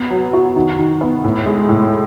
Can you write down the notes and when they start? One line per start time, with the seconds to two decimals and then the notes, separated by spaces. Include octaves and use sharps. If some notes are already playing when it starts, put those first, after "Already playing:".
Already playing: B3
0.10 F#3
0.33 F#4
0.56 D#3
0.78 D#3
1.01 B3
1.24 A2
1.46 G#3
1.69 A2